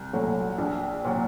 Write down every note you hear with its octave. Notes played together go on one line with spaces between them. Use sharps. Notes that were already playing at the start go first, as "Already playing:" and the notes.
Already playing: C2
A#2 F#3 A3
A#1
A#2 F#3